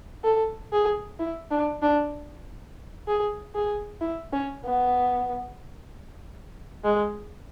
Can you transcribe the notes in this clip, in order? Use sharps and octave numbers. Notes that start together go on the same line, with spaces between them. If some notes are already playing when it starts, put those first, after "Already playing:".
A4
G#4
E4
D4
D4
G#4
G#4
E4
C#4
B3
G#3